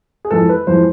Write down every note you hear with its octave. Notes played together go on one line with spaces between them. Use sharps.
G#4
F2 E3 G#3 A4
B4
F2 E3 G#3 C5